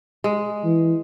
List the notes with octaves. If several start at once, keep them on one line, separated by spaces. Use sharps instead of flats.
G#3
E3